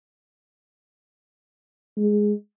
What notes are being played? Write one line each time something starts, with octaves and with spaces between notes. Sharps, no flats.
G#3